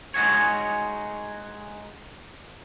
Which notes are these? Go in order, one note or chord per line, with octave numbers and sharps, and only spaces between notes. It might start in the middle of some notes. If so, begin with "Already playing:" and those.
G#3 D#4 F#4 G#4 C#5